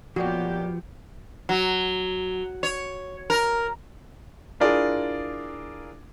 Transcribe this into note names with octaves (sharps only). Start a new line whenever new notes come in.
F2 A#2 F3 F#3 B3 F#4 G4
F#3
C#5
A#4
D4 E4 F4 G#4 A#4 D5